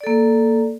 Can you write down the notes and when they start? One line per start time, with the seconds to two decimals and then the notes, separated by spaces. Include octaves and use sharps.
0.01 D5
0.04 A4
0.07 A#3